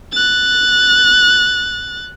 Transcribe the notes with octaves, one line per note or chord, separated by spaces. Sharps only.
F#6 A6